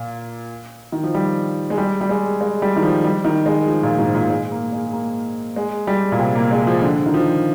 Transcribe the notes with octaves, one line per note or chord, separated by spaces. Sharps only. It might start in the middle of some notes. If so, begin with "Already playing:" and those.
Already playing: A#2
D#3
F3
G3
G#3
G3
G3
G#3
G#3
G3
D#3
F3
G3
D#3
G#3
F3
A#2
G#2
A#2
G#3
A#3
G#3
A#3
G#3
G3
A#2
C3
A#3
G#3
F3
D3
D#3
F3